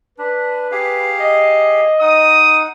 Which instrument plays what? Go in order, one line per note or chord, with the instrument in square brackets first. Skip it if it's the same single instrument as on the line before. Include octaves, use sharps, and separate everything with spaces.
[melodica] D4 [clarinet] B4
[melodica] G4 G#4 F5
[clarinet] D#5
[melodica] D#4 F#5 [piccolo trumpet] D#6